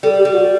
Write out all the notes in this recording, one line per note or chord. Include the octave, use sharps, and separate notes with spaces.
G3 A4
G4
G3
F#4